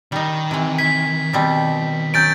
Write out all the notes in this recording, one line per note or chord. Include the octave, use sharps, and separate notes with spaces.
D#3 G3 D#4
C3 E3
G#5 B6
B2 G3 C4
F#3 C#4 G6 A6 D7